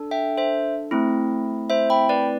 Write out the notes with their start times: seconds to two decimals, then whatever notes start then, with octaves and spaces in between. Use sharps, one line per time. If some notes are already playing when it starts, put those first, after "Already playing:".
Already playing: D4 A4
0.11 E5 G5
0.38 C5 E5
0.91 A3 C4 E4
1.70 C5 E5
1.90 G5 B5
2.09 B4 D5